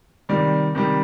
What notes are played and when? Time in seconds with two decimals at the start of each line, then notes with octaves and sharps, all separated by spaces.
0.29 C3 D#3 G3 D5
0.75 C3 D#3 G3